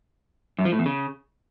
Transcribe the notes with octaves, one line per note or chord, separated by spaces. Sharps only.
F#2
F3
A2
E2
C#3